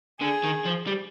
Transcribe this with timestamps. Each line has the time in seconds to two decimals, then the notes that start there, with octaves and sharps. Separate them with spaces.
0.21 D3 G#4
0.43 D#3
0.65 F3
0.87 G3